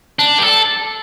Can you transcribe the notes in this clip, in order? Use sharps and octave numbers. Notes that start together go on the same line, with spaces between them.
D4
G4
A4